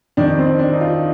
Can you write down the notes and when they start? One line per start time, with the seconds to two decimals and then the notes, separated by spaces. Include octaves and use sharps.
0.17 F2 D#3 D4
0.39 C4
0.59 D4
0.73 D#4
0.81 F4